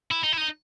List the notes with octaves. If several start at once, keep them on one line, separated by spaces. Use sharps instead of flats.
E4
D#4
E4
D#4